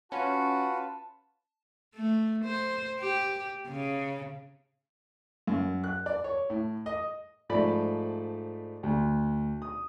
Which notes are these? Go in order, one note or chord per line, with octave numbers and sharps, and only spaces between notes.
C#4 F4 F#4 B4 A5
A3
C5
G4
C#3
F#2
F#6
D5
C#5
A2
D#5
G#2 F3 A3 D5 B5
D2
D#6